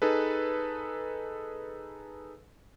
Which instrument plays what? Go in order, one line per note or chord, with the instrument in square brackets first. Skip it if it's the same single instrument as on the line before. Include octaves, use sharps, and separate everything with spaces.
[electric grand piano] D#4 G#4 A4 B4